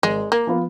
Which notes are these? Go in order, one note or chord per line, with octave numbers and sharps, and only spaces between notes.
G#1 G#3
A#3
F3 B3 F4